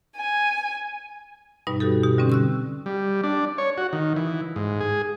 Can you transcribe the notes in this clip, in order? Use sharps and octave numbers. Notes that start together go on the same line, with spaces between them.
G#5
G2 B2 G3 D#4 B4
F#4 G4 A4
B2 G4
D3 G3 C4 C#4
C#6 E6 F#6
G3
D4
C#5
F#4
D#3
E3
G#2
G#4